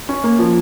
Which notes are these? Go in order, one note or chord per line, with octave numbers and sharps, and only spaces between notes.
C#4
A#3
F3